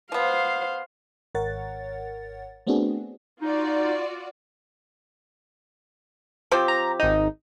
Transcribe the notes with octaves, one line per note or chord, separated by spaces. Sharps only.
F3 B3 C5 F5
G#1 A#4 C#5 F#5 A6
A3 B3 C4 D4 F#4 G#4
D#4 F4 F#4 D5
F3 C4 G4
A#5
G#1 D#4